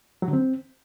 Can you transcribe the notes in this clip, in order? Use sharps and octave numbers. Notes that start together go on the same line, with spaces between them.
F#3
D3
C4